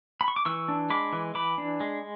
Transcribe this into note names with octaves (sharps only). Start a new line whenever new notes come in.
B5
C#6
D6
E3 C#6 E6
D4
G#3 B5 D6
E3
E3 B5 D6
D4
G#3